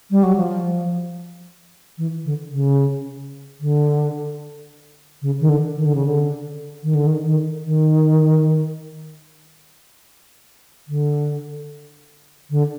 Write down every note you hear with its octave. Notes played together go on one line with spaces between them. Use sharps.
G3
F#3
F3
E3
D3
C#3
D3
C#3
D#3
D3
D#3
D3
C#3
D3
D#3
D3
D#3
D#3
D#3
D3
D3